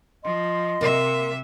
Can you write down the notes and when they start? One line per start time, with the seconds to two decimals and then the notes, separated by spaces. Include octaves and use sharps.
0.24 F3 D#5 C6
0.81 C3 A#3 E5